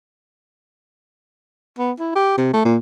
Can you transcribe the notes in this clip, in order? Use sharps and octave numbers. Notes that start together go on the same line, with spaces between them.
B3
E4
G4
C3
A3
A#2